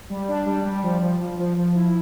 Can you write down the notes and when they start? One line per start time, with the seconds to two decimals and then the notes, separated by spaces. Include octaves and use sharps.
0.10 G3
0.28 D4
0.46 G3
0.65 G3
0.83 F3
1.01 F3
1.20 F3
1.39 F3
1.57 F3
1.75 E4